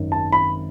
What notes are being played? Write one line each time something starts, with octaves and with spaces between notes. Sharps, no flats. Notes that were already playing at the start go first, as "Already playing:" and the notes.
Already playing: G#1 F#2 D#3
A5
B5